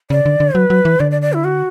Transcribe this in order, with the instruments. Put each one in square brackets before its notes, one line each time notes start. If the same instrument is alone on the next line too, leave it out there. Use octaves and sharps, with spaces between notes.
[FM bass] C#3 [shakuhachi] D5
[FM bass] D3
D3
[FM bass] F#3 [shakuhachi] B4
[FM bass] F#3
E3
[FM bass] D3 [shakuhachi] D5
[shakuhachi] D5
D5
E4
F#4